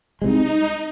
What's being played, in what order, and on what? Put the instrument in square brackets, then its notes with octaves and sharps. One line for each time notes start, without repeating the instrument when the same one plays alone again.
[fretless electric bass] C2 C3 G#3 [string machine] D#4